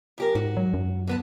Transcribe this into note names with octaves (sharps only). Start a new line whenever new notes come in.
F#2 G4 A#4
G#2 F#4
F#3
F#2
D3 B3 A5